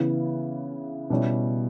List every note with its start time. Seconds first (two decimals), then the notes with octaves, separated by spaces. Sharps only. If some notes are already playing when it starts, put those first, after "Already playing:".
Already playing: C#3 E3 B3 E4
1.10 B2 G3 C#4 E4